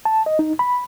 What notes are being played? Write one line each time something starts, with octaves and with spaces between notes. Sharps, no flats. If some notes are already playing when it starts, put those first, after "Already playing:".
A5
D#5
D#4
B5